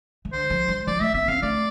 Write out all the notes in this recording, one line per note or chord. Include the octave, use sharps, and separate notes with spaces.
E3
D3 C5
F3
G3
F3 D5
A3 E5
B3 E5
C4 F5
A3 D5